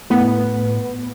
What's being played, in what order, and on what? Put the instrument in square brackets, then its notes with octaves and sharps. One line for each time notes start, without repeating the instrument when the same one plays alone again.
[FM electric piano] A2 [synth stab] B3